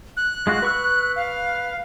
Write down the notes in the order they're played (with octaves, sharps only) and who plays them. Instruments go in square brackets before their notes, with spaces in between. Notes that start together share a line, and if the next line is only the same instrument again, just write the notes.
[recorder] F#6
[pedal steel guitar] G#3 F4 F#4
B4 C#6 E6
[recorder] F5